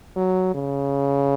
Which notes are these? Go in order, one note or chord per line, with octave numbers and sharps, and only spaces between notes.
F#3
C#3